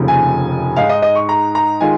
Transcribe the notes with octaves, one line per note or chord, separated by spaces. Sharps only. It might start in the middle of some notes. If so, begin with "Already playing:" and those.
Already playing: F1 D#2 C#3 F3
G#5
G#2 G#3 D#4 F5
D#5
D#5
C#6
A#5
A#5
D#3 G#3 F4 G#5